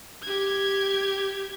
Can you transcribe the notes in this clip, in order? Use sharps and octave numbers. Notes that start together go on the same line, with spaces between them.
G4 G#6